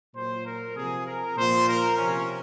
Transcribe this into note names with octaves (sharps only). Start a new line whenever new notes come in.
A#2 F#3 C5
A#4
C3 F3 G#4
A#4
A#2 F3 C5
A#4
C3 F3 C#4